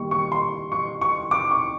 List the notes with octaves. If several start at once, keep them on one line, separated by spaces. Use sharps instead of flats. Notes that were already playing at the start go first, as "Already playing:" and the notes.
Already playing: D#3 G3 A#3 C#6
C#6
C6
C#6
C#6
D6
C#6